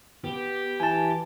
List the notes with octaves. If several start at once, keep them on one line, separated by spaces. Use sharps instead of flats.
B3 G4
E3 G#5 A5